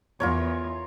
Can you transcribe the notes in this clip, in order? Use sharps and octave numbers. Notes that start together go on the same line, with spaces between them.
E2 F4 A#4 C#5